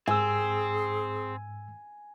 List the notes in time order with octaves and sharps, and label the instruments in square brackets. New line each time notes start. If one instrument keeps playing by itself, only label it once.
[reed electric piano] G#2 E6 [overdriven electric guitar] C4 [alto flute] G#4 [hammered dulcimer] G#5